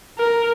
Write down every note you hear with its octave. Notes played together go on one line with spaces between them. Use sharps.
A#4